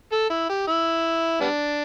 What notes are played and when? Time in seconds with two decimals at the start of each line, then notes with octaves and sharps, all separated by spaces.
0.12 A4
0.30 E4
0.49 G4
0.67 E4
1.40 G3 B3 D4